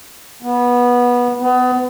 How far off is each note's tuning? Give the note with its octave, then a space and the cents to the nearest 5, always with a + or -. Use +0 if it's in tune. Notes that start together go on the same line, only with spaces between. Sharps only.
B3 -20
B3 +30